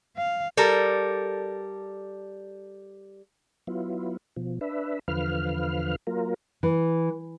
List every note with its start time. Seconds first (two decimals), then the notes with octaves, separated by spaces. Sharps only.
0.17 F5
0.57 G3 A4 A#4
3.67 F#3 B3 E4 F4
4.36 B2 F3
4.61 D4 B4 E5
5.08 E2 D3 F3 B4 F5 F6
6.07 F#3 A#3 F4 A#4
6.63 E3